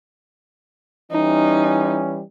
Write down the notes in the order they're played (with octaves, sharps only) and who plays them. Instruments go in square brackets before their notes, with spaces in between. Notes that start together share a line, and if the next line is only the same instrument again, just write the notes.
[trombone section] E3 G3 C#4 [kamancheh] D#4